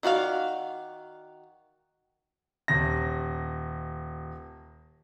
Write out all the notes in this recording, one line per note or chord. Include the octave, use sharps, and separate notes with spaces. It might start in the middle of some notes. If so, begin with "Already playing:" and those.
D#3 F#4 D5 F5
D#1 A#6